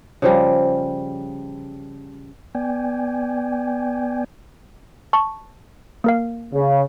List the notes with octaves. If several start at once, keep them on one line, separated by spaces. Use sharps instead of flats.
C#3 F3 G3
B3 D5 G5 G#5
A5 C#6
A#3 A#4 F5
C#3